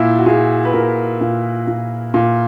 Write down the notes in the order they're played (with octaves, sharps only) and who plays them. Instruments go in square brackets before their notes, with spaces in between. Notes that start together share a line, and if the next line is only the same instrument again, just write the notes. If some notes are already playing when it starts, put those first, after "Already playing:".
Already playing: [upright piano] A#2 E4
F#4
A#2 G#4
B4
A#2 A#4
A#2
A#2
A#2